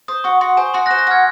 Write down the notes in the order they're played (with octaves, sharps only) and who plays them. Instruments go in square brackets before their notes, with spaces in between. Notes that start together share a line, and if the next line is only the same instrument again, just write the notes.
[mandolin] C5 [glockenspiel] D#6
[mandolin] F#4 [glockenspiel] C#6
[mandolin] F#4 [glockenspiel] C6
[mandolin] C5 [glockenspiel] G#5
[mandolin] F#4 [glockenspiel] C6
[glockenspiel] F#6 A#6
[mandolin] C5
[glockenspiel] F#6 A#6
[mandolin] F#4 [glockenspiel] F6 G#6